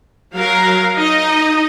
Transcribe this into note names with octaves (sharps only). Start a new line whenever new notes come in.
F#3 A#4 F5
D#4 D#5